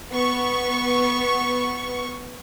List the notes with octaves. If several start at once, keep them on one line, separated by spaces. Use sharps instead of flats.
B3 C#6